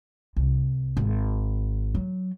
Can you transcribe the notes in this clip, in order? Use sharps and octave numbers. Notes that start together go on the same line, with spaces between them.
C2
G#1
F#3